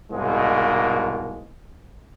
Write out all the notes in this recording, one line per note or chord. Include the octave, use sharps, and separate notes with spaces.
C2 G#2 B2 G#3 A#3